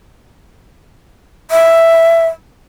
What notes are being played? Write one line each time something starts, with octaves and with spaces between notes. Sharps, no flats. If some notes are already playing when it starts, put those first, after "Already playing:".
E5